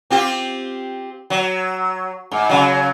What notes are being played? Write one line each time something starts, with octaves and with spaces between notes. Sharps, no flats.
C4 F4 G4
F#3
G#2
C#3 F#3